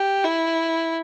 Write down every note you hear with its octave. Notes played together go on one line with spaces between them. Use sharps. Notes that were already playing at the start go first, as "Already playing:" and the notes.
Already playing: G4
E4